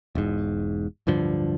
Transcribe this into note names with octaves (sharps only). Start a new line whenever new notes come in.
E1 G#2
D1 G2 D3 F3